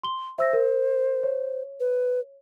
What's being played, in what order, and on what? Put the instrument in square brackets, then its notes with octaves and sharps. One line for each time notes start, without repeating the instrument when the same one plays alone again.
[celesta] C6 G7
[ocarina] C5 [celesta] E5 E6 A#6
[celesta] A#4
C#5
[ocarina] B4